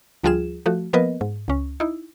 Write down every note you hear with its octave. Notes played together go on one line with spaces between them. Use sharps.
D2 F3 G3 F4 G#4 E7
F3 A3 F#4
F3 A#3 B3 A#4 B4 D#5
G#2
C#2 C#4
D#4 E4